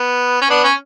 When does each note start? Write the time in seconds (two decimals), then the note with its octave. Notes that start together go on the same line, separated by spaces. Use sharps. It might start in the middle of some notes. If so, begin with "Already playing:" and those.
Already playing: B3
0.41 C#4
0.50 B3 D4
0.64 C#4